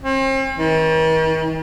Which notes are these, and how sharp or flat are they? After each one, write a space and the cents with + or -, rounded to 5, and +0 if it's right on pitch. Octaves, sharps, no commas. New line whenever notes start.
C4 +40
D#3 +45